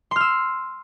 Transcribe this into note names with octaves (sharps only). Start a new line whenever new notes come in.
C6 E6 F6